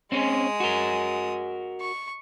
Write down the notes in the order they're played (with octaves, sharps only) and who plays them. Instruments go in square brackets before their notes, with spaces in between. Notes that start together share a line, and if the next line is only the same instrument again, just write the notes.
[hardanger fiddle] G#3 D#6 [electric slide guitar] C4 C#4
[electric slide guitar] F#4 A#4
[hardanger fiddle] C#6